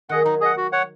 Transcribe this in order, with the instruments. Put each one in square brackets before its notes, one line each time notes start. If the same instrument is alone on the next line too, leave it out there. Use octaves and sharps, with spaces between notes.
[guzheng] D#3 [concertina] G#4 D#5 F#5
[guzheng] F#3 [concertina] D#4
[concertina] G#4 D#5 F#5
F#4
C#5 F#5